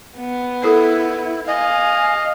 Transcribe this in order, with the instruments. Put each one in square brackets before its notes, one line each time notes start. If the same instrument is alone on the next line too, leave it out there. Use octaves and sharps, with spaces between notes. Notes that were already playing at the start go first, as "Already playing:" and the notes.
[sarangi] B3
[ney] E4 [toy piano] A4 A#4 F#5
[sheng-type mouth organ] D#5 [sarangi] F5 [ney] G#5